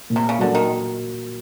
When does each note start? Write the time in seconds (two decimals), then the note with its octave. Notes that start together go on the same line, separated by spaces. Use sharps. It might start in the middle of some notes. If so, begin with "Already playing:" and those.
0.10 A#2
0.16 C3
0.29 C#3
0.39 D3 F#3 A#3
0.55 D#3